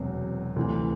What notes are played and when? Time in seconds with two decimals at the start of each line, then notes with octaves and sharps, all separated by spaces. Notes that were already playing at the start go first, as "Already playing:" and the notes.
Already playing: E1 E2 C3 F#3 C4
0.56 D2 C3 E3